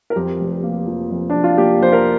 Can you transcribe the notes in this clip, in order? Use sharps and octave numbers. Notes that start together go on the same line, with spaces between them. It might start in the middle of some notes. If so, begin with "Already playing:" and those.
A#4
F2 G4
F1
A#3
F3
F2
F1 D4
F4
A#3 G4
F3 C5
A#4